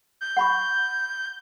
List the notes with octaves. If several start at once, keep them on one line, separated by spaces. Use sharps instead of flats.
G6
F#5 B5 C#6